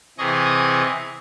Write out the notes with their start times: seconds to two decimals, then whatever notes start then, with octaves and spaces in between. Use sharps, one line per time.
0.18 C3 E3 G#4 D#5 C#6 D#6